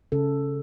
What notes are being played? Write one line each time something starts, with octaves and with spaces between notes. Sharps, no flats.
C#3 A4